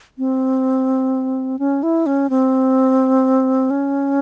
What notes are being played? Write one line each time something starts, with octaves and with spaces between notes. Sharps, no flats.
C4
C#4
E4
C#4
C4
C#4